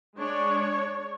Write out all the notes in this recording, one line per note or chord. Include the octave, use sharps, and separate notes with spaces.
G#3 D4 C#5